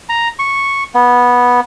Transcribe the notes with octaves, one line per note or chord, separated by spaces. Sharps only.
A#5
C#6
B3